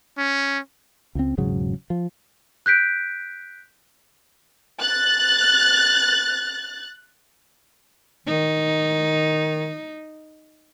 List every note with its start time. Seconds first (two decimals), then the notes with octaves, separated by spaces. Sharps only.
0.18 C#4
1.15 C#2 C4
1.38 E1 G#2 C#3 F#3
1.90 F3
2.66 F#6 G6 B6 D7
4.80 F#6 A6
8.27 D#3 D#4